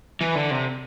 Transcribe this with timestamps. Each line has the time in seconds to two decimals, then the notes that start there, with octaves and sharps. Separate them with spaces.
0.21 E3
0.35 D3
0.51 C3